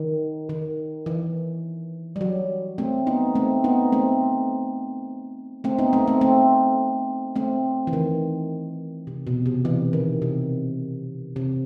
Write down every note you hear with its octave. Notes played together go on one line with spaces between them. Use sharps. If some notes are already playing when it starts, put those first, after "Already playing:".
Already playing: D#3
D#3
E3
G3
F#3
A3 C4
B3 D#4
A3 C4
B3 D#4
A3 C4
A3 C4
B3 D#4
A3 C4
A3 C4
A3 C4
A3 C4
E3
D#3
C3
B2
C3
E3
D#3
C3
C3